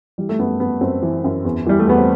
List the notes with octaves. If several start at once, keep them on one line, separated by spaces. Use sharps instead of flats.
E3 G3
A3
F#2 B3
F#2 B3
F#2 C4
E3
F#2
E2
E3 G3
A3
E2 B3
C4